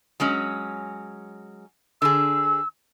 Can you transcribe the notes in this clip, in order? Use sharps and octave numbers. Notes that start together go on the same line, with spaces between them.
F#3 G#3 C#4
D3 G#4 E6